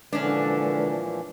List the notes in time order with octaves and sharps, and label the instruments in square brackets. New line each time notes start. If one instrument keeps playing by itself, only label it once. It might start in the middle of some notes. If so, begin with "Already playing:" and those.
[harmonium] A#2 E3 F3 [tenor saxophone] D3 [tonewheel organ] G#3 B4 [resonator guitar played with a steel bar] C#4 D4